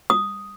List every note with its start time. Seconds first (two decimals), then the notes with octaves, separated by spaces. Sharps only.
0.10 D#6